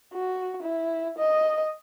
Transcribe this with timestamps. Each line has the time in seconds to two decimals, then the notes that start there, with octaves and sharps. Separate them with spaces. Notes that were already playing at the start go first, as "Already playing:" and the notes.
0.13 F#4
0.62 E4
1.18 D#5